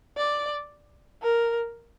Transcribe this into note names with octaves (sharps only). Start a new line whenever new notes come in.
D5
A#4